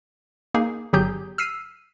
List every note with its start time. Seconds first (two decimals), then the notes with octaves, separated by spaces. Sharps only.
0.54 A#3 D#4 G#4
0.93 G1 F#3 G4 G#4 G6
1.38 E6 F6 B6 C7 D#7